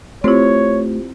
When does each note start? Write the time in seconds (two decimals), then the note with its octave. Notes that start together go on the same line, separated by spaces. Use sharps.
0.24 A3 C4 E4 F4 G4 C5 C#5